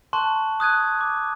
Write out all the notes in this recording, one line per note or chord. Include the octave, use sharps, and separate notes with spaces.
A5 C6 C#6 F#6
D#6 F#6 G#6 D#7
D6